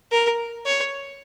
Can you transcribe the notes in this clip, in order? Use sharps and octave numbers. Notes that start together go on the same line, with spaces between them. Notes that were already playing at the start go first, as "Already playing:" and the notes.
A#4
C#5